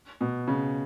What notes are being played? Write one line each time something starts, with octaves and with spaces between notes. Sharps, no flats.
B2
C#3